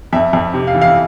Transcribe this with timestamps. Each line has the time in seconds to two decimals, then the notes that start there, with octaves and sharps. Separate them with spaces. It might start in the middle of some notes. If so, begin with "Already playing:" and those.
0.13 F2 E5
0.33 F2
0.54 C3
0.67 F5
0.75 E3
0.82 F5